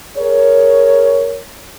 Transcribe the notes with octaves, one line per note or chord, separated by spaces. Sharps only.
G#4 A#4 C#5